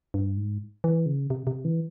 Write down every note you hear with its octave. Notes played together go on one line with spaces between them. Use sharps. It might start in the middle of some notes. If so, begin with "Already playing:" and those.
G2
G#2
E3
C#3
C3
C3
E3